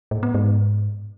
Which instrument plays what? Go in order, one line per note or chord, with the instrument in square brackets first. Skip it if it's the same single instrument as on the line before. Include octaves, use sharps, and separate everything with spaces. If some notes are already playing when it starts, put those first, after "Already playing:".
[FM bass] A2
B3
G#2